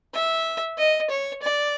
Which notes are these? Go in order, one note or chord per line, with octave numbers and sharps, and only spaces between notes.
E5
D#5
C#5
D5